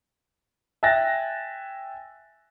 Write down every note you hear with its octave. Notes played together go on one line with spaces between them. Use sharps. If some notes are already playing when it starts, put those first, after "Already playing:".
E5 G5 G#5 F#6 A6 A#6